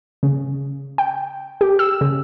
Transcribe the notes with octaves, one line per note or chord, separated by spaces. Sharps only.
C#3
G5
G4
E6
C#3